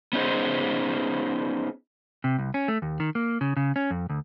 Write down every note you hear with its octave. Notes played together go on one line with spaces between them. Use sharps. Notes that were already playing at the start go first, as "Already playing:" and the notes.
B3 C#4 D#4 G#4 C5
C3
C2
C#4
A3
D#2
D#3
A#3
C#3
C#3
C#4
F2
D2